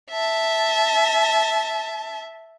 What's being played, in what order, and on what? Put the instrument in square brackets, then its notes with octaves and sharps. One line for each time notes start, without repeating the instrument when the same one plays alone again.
[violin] E5 A5